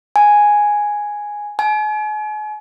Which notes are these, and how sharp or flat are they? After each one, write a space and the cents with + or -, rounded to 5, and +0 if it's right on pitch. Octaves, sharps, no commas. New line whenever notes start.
G#5 +0
G#5 +40